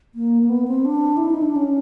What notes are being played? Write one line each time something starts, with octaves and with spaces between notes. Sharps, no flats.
A#3
A#3
B3
C4
D4
E4
D#4
D4
C#4